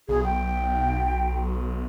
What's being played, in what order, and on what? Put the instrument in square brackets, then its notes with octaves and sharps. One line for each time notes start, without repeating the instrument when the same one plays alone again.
[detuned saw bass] B1 [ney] G#4
[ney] G5